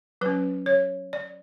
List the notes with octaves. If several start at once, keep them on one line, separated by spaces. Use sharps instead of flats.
F#3 C#4 B4
C#5
D5